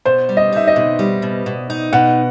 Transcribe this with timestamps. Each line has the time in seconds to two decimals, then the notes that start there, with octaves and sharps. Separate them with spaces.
0.05 B2 C5
0.29 G3
0.37 D#5
0.52 D#4 E5
0.67 D#5
0.76 B2
0.99 G3
1.22 B2
1.46 B2
1.70 D#4
1.93 B2 F#5